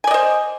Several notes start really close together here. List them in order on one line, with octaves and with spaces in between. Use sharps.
G#5 D5 D#5 C5